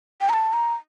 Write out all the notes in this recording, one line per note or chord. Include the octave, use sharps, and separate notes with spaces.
G5
A#5
A5
A#5